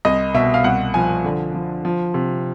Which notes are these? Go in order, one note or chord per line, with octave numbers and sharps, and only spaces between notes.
C2 D#5
B2 E5
F5
C2 F#5
F3 G#5
D3
F3
F3
C3